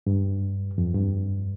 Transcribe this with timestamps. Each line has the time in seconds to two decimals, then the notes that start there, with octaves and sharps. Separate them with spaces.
0.07 G2
0.78 F2
0.95 G2